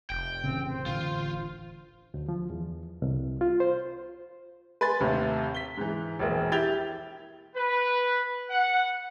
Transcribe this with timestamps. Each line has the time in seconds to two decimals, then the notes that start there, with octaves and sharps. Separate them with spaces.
0.10 F1 G5
0.44 A1 C#3 C4
0.69 C5
0.86 A1 D3 F4
2.14 D2
2.28 F3
2.50 E2
3.02 C2
3.41 F4
3.60 C5
4.81 B4 G#5 C6 A6
5.00 D#2 A2 C3
5.55 B6 G7
5.77 G#2 E3
6.19 E1 A#1 A#3
6.52 E4 G4 G#6 A6 F7 G7
7.55 B4
8.50 F#5